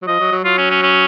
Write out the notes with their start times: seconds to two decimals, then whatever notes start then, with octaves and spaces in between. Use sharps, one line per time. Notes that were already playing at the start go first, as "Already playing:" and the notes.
0.02 F#3
0.07 F3 D#5
0.20 F#3
0.32 F#3
0.44 F#3 F4
0.58 C#4
0.70 C#4
0.83 C#4